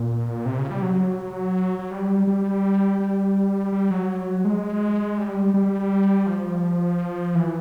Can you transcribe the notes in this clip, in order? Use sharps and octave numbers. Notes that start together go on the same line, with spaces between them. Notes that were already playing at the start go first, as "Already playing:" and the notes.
Already playing: A#2
C3
C#3
G3
F#3
F#3
G3
G3
G3
G3
F#3
G#3
G3
G3
F3
E3